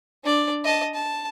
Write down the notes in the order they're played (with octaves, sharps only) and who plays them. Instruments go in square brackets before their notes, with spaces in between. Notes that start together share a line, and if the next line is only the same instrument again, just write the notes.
[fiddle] D4 D5
D#5 A5
A5